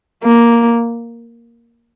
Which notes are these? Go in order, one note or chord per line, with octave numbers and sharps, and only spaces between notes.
A#3